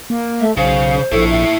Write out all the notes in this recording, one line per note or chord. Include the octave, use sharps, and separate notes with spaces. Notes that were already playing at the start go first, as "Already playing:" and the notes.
A#3
A3 E5
B1 C#3 C5 F5
A#1 E4 A4 C#5
E5